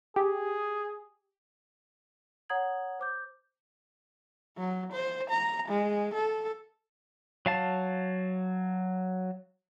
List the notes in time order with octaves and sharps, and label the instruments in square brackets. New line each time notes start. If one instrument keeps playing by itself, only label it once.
[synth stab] G4 [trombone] G#4
[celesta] C#5 F#5 A#5 D#6 G#6 F#7
C5 D6 G6
[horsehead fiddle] F#3
C5
A#5
G#3
A4
[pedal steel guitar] F#3 F5 A5